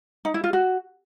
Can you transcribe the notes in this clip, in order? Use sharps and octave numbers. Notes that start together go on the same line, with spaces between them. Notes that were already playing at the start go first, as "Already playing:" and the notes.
D#4
E4
F4
F#4